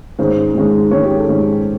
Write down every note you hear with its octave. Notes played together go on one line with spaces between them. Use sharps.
G#2 D#3 G#3 C#4 C5
G#2 D#3 G#3 C#4
G#2 D#3 G#3 C#4 C#5
G4
A4
G#2 D#3 G#3 C#4